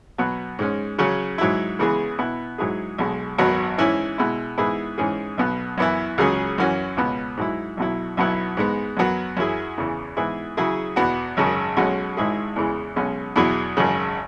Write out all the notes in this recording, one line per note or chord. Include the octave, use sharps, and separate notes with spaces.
B2 F#3 B3 F#4
G#2 G#3 C#4
C#3 F#3 C#4
G#2 F#3 E4
C#3 E3 G#3 B3 G#4
B2 B3 E4
G#2 F#3 E4 G#4
B1 B2 G#3
G#1 F#2 F#3 B3 F#4
G#2 E3 C#4 E4
B2 G#3 E4
G#2 E3 B3 E4 G#4
G#2 E3 G#3 C#4 G#4
B1 B2 B3
F#2 E3 B3 E4
C#2 C#3 F#3 C#4 G#4
F#2 E3 C#4 F#4
C#2 B2 B3
G#2 F#3 E4
B1 B2 F#3 E4
B1 B2 F#3 B3 E4
G#2 G#3 B3
F#2 F#3 B3 F#4
F#2 F#3 E4 G#4
E2 C#3 E3
G#2 E3 B3 E4 G#4
C#3 F#3 E4 G#4
E2 B2 B3 F#4
G#1 F#2 C#3
B1 B2 G#3 C#4 F#4
G#1 G#2 G#3 E4 G#4
E2 C#3 E3 G#3
B1 B2 G#3 C#4
E2 B2 F#3 E4 G#4
G#1 F#2 C#3